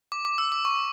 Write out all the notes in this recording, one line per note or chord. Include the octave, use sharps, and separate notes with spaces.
D6
D6
E6
D6
C#6